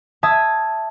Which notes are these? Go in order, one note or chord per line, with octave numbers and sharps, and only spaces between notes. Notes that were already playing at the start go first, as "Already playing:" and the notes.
E5 A5 D#6 G#6